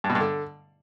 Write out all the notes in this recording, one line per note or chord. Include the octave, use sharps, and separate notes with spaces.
G2
B2
G2
D3